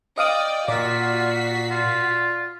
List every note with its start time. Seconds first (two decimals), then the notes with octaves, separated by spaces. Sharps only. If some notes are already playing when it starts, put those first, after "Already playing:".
0.18 D5 D#5 F5 G5 D#6
0.68 A#2 F4 F#4 D5 B6 C7
1.70 F4